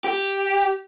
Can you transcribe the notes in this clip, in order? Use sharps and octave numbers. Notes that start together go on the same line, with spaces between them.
G4